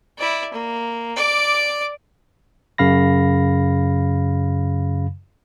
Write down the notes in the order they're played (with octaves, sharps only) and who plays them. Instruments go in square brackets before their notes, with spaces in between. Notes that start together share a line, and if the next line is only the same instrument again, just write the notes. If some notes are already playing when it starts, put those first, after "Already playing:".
[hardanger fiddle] E4 D5
A#3
D5 D6
[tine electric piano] F#2 C#3 F5 B5 A#6